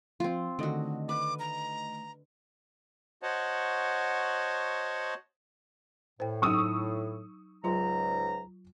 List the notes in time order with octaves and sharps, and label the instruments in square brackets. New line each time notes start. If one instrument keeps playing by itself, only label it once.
[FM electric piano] F3 [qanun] C4 F4
[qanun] D3 F#4 [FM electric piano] D#3 A3 D#5
[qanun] B4 [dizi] D6
[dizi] A#5
[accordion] F#4 C5 C#5 D#5 F#5 A5
[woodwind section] A2 [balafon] C5 G5
[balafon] F#3 D#4 [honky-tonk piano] C#6 D#6 E6
[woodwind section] C#2 G#2 A#5 [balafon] F#3 F4 C6